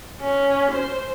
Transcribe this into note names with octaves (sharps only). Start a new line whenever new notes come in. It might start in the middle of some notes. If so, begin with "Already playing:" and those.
C#4
C5